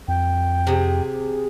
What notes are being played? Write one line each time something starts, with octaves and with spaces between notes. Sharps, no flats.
F2 G5
C3 G#4